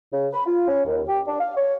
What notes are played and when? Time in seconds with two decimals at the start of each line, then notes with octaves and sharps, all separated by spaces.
0.12 C#3
0.33 B5
0.46 F4
0.68 C#4
0.86 D#2
1.08 G4
1.28 D4
1.40 F5
1.56 C#5